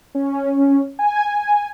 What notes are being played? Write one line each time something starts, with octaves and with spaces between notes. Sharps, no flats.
C#4
G#5